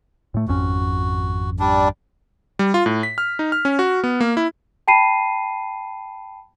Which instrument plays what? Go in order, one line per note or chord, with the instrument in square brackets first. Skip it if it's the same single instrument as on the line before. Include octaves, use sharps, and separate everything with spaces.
[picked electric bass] A2 A3
[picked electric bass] G#1 F2 C#4 [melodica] F#4
[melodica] G3 D4
[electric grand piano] G3
F4
A2
B6
F6
D#4
F6
C#4
F#4
B3
A#3
E4
[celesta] G5 A5 B5 C7 D#7